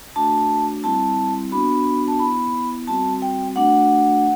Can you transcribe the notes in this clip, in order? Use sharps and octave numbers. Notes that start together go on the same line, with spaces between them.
A3 D4 F#4 A5
G3 C4 E4 A5
B3 D4 F#4 B5
A5
B3 E4 B5
G3 C4 F#4 A5
G5
A3 D4 F#4 F#5